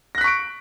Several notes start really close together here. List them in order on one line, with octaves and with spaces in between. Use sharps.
A#6 F#6 B6 C#6 D7